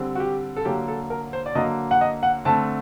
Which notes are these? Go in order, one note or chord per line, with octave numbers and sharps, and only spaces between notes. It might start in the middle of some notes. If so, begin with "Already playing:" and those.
Already playing: D3 G3 C4
F#4
G4
A4
D3 F#3 A#3 G4
A4
A#4
C5
D5
D3 F#3 A#3 D#5
F#5
D#5
F#5
D3 A3 C4 A5